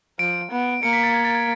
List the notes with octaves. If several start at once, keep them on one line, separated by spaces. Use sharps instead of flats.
F3 D7
B3
A#3 C#7
B6
A6
G#6
A6
G#6